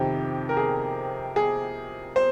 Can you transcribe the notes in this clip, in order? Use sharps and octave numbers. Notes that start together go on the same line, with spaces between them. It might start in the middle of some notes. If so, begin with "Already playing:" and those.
Already playing: F2 C3 D#3 G4
A#4
G#4
G#4
C5